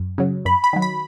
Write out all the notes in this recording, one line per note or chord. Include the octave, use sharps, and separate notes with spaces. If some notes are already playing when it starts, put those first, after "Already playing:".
Already playing: F#2
C#3 F#3
F#2 B5
B5
D#3 F#3
B5